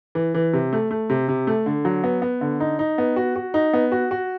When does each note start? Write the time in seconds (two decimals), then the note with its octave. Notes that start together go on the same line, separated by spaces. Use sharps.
0.15 E3
0.34 E3
0.53 C3
0.73 A3
0.91 A3
1.10 C3
1.28 C3
1.47 A3
1.66 D3
1.85 F#3
2.04 B3
2.22 B3
2.41 D3
2.60 D#4
2.79 D#4
2.98 B3
3.16 F#4
3.36 F#4
3.54 D#4
3.74 B3
3.92 F#4
4.11 F#4